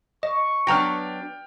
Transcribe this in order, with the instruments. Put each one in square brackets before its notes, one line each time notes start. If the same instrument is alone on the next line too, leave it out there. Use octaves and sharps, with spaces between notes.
[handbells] D#5 [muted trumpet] C#6
[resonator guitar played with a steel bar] F#3 B3 D4 [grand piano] G5 F6 [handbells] A#5 A#6